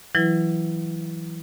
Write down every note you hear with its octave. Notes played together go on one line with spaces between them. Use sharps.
E3 F#3 E4 B4 A#6